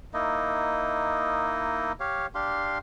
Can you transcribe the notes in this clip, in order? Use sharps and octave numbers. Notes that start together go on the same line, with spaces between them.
A#3 D#4 E4 D#5
G4 C#5 F5
D4 G4 F5 C6